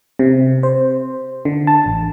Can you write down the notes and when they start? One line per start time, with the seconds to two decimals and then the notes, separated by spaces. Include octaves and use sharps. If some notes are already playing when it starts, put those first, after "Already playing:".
0.19 C3
0.63 C5
1.45 D3
1.67 A5
1.86 A1